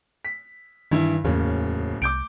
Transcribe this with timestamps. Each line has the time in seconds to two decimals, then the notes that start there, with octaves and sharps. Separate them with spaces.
0.25 B6
0.91 G2 D#3 E3 E4
1.24 D1 E2 C#3 A#3
2.02 C2 D6 G6 D7